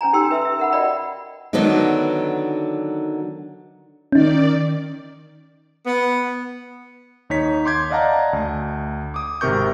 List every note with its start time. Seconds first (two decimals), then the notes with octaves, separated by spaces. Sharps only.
0.01 C#4 C5 G#5 A#5
0.13 D#4 G4 A4 G5 C6 E6
0.31 B4 E5 C6 E6
0.45 E5
0.59 A#4 F#5 B5
0.72 F#4 D5 D#5 F#5 G5 B5
1.53 D3 D#3 F#3 B3 D4 D#4
4.12 D#3 C#4 D#4 D5
5.86 B3
7.30 D#2 D#4 C#5 B6
7.65 C6 D6 G6 G#6
7.90 D5 D#5 F5 F#5 A5 A#5
8.33 D2
9.14 D6 D#6
9.41 G#1 C3 A#4 C#6 G6